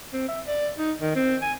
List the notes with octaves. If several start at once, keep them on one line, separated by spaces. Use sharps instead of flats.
C4
E5
D5
D#4
D#3
C4
G#5